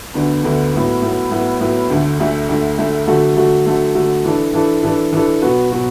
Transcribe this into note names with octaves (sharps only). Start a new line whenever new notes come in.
D2 D3 B3 D4
D2 D3 B3 D4
A2 F#3 B3
A2 F#3 B3
A2 F#3 B3
A2 F#3 B3
D2 D3 A3
D2 D3 A3
D2 D3 A3
D2 D3 A3
D3 F#3 A3 F#4 A4
D3 F#3 A3 F#4 A4
D3 F#3 A3 F#4 A4
D3 F#3 A3 F#4 A4
E3 D4 A4
E3 D4 A4
E3 D4 A4
E3 D4 A4
B2 F#3 B3 F#4
B2 F#3 B3 F#4